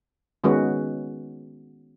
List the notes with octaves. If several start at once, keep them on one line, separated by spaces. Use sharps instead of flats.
D#3 G#3 B3 C#4 F#4 B4